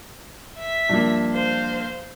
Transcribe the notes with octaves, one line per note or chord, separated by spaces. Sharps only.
E5 B6
G2 F3 A#3
C5 F5